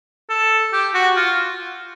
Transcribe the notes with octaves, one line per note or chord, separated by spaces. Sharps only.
A4
G4
F#4
F4